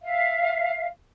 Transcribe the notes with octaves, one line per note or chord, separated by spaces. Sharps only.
E5 F5